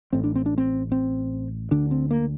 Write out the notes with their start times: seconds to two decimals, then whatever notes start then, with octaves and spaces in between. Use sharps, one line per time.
0.13 A1 A2 C4
0.24 D4
0.35 C4
0.46 D4
0.58 C4
0.92 C4
1.71 D2 D3 D4
1.91 C4
2.11 A#3